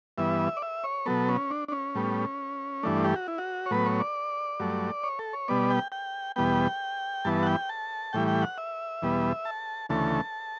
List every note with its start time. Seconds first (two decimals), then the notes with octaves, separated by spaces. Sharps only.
0.18 G2 E3 B3 E5
0.57 D5
0.62 E5
0.84 C#5
1.06 B2 F#3 B3 A4
1.29 C#4
1.50 D4
1.68 D4
1.72 C#4
1.95 A2 G3 B3
2.83 G2 E3 A3 D4
3.04 G4
3.16 F#4
3.28 E4
3.38 F#4
3.66 C#5
3.71 A2 F#3 B3 B4
3.86 C#5
4.00 D5
4.60 G2 F#3 A3
5.04 C#5
5.19 A4
5.33 C#5
5.48 B2 G3 B3 D5
5.70 G5
5.92 G5
6.36 E2 B2 G3 B3 G5
7.25 G2 E3 B3 A5
7.43 F#5
7.47 G5
7.69 A5
8.13 A2 E3 G3 G5
8.28 G5
8.42 F#5
8.58 E5
9.02 E2 B2 G3 B3
9.45 A5
9.89 D2 C#3 E3 A3 A5